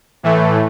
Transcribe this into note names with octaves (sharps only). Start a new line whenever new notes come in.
A2 E3 A3